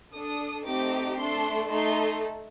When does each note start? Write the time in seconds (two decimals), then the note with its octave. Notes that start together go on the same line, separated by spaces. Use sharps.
0.13 D4 A4 D#6
0.66 A3 C4 D#4 G4 D6
1.18 A3 D4 A4 C6
1.70 A3 D#4 A4 C6